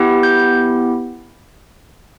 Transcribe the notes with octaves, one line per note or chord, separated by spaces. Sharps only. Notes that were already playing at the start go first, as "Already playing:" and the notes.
Already playing: B3 E4 G4
G6